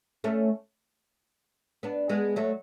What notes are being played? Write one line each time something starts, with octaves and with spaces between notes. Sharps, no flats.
A3 C#4
B3 D4
G#3 B3
F#3 A3